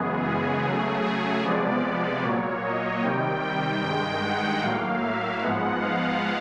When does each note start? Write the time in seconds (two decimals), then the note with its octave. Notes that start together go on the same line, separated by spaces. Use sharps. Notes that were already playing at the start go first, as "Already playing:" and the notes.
Already playing: F#2 C#3 E3 G#3 B3 G#4
0.23 G#4
0.63 C#3 F#3 A3
1.03 G#4
1.42 C3 F3 G#3 B3 D5
1.82 D5
2.23 A#2 F#3 A#3 C#5
2.63 D#5
3.02 C3 D#3 G3 G5
3.42 G5
3.81 G2 D#3 G#3 G5
4.22 F#5
4.62 A2 F#3 A#3 F5
5.01 E5
5.41 G#2 F3 G#3 B3 F#5
5.81 F5